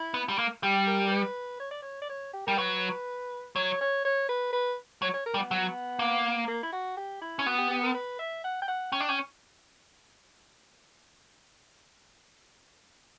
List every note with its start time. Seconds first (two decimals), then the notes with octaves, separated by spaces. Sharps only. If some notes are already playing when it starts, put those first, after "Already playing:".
Already playing: E4
0.14 B3
0.29 G3
0.38 A#3
0.63 G3 G4
0.87 A#4
1.07 A#4
1.11 B4
1.60 C#5
1.71 D5
1.82 C#5
2.02 D5
2.09 C#5
2.33 G4
2.47 G3 A#4
2.58 F#3 B4
3.56 F#3 C#5
3.81 C#5
4.05 C#5
4.29 B4
4.53 B4
5.02 F#3 C#5
5.14 C#5
5.26 A#4
5.34 G3
5.39 B3
5.51 F#3
5.99 A#3
6.48 A#3
6.63 E4
6.73 F#4
6.97 G4
7.22 E4
7.39 C#4
7.46 B3 F#4
7.58 G4
7.70 G4
7.83 A#4
7.95 B4
8.19 E5
8.44 F#5
8.62 G5
8.68 F#5
8.92 C#4 G5
9.01 D4
9.09 C#4 G5